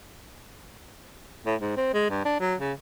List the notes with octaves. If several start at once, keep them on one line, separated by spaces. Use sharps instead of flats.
A2
G#2
C4
G#3
G2
D4
F#3
C#3